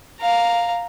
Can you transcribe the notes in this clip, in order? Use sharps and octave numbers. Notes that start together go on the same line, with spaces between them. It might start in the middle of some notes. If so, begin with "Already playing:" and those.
F5 A#5